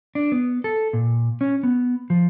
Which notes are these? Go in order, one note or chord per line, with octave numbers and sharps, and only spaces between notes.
D4
B3
A4
A#2
C#4
B3
F3